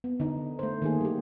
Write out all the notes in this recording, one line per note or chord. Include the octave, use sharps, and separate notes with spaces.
B3
D3 D#4
A3 C5
D#3 A#3 G#4
G3 G4